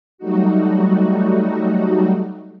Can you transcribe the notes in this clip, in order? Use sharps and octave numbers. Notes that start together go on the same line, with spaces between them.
F#3 G3 A3 D#4 F#4